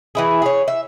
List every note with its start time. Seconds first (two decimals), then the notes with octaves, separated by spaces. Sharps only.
0.15 E3 E4 G#4
0.42 G#4 C#5
0.68 E5